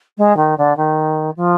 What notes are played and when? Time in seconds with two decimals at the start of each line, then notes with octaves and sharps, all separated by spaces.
0.18 G#3
0.37 D#3
0.58 D3
0.77 D#3
1.37 F3